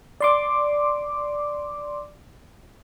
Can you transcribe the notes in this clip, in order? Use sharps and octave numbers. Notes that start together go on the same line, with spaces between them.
D5 C6 D6